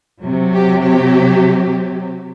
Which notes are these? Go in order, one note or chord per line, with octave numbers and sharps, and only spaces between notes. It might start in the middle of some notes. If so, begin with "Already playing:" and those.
C3 F#3
G4
G4